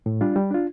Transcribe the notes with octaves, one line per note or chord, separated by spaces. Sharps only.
A2
G3 D4 F4
G3
D4 F4